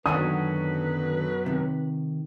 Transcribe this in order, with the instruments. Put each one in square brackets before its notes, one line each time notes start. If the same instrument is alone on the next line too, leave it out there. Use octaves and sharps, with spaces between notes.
[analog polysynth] F#2 B2 F#3 [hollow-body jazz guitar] D3 D#3 D4 [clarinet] B4 [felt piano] D#6
[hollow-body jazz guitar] C3 D#3